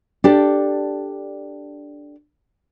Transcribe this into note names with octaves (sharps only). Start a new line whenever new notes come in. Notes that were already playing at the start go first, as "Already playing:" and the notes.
D4 G4 A4